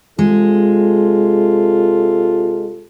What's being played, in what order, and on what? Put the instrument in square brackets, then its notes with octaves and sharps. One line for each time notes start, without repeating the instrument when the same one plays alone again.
[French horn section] C3 F4 A4 [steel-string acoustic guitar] G#3